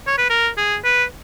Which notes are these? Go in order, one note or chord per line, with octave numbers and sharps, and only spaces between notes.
C#5
B4
A#4
G#4
B4